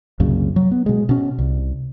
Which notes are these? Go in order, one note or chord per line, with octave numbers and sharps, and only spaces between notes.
C2 F#2 A#2 C#3
F#3
B3
B2 G#3
B2 C#4
C2